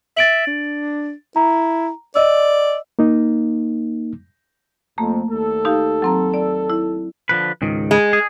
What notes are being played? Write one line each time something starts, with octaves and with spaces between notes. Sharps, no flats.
E5 A6 D7 F#7
D4
E4 A#5
D5 D#5 E6
A#3 D#4
F2 A3 A#3
D#2 A4
D#4 G4 F5
F#3 C4 A#5
D5
E4
D3 F3 B4
C#2 G#2 D#3
G#3
G#4